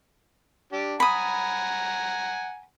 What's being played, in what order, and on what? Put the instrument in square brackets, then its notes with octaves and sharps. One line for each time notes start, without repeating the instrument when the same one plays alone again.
[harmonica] D4 G4
[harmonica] F#5 G#5 A#5 [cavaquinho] B5 D#6